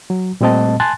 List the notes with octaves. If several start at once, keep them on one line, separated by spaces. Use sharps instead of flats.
F#3
A#2 G3 A3 C4 D#5 A5
G#5 A5 C6 F#6 A6